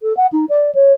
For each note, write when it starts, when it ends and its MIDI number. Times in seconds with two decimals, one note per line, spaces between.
0.01 0.15 69
0.17 0.26 78
0.32 0.45 63
0.49 0.73 74
0.74 0.92 73